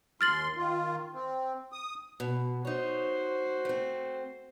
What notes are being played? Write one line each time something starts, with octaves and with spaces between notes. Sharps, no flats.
D#2 C6 F6 A6 F#7
D#3 F4
C4
D#6
B2
D#4 F#4 C5 C#5
A3 C4